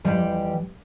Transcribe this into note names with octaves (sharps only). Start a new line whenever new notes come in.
F2 E3 G3 G5